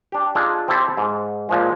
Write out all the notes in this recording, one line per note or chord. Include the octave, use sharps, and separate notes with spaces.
D4 G4
D4 D#4 F4 G#4 A4
C4 E4 G4 A4 C5
G#2
A#2 F3 G#3